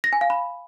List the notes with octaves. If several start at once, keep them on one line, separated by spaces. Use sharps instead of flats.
A#6
G#5
F5
B5